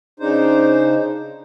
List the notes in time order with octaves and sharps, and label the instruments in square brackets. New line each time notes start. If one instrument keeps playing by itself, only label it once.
[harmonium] C#3 D4 D#4 C5